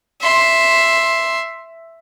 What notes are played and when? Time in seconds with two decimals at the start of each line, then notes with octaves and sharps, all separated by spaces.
0.22 E5 C6